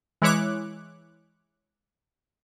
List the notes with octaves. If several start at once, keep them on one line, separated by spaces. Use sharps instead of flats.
E3 G#3 E4 C#5 D6 F#6